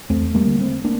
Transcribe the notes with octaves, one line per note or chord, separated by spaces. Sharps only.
E2 A3 C4
G3 A#3
D3
A3 C4
A#3 D4